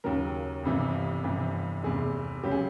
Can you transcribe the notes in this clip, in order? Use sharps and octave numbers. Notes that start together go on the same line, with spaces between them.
D#2 C#3 F#3 A#4
G1 F2 C3 E3
G1 F2 C3 E3
F1 E2 C3 G#4
C#2 C#3 F#3 G4
G#4